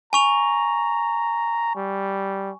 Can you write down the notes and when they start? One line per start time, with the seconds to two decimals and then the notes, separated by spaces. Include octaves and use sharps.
0.13 G#5 A#5 C#6 F7
1.76 G3